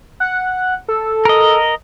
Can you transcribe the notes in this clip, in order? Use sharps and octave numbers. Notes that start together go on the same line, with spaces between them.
F#5
A4
A#4 D#5